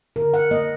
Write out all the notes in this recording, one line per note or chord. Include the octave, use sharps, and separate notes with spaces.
D3 A#4
F#5
A#3 D#5